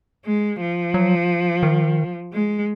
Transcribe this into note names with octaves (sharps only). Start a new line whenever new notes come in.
G#3
F3
F#3
D#3
G#3